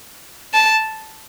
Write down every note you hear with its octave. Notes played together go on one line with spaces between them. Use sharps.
A5